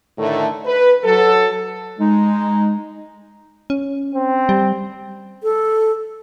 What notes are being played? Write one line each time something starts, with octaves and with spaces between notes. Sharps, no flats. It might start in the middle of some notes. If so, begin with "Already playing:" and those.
A2 D3 D#3 A3
B4
F#3 A4
G#3 D#4
C#4
C4
G3
A4